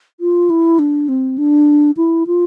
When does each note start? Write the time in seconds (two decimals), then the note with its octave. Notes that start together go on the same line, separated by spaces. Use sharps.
0.20 F4
0.50 E4
0.79 D4
1.09 C4
1.38 D4
1.97 E4
2.27 F4